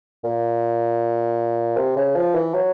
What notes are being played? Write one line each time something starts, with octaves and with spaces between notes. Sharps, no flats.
A#2
C3
C#3
F3
E3
F#3